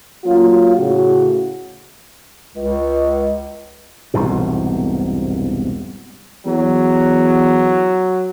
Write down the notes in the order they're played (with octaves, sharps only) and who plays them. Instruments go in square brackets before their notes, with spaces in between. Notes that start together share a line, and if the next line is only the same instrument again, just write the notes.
[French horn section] F#3 A#3 C#4 F4
A2 C#3 F#4
[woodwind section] C#2
[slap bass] E1 C2 G#2 B2
[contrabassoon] E2 [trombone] F#3